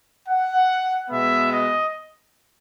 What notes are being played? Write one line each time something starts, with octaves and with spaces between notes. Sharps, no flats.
F#5
B2 G#3 B3 E5
D#5